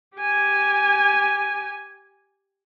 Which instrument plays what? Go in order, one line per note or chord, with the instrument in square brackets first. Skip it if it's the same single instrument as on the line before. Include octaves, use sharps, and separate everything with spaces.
[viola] G4 G#5